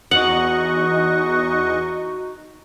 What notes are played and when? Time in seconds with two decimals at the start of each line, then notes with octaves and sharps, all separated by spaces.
0.11 E2 D#4 F#4 D#5 F#5 C#6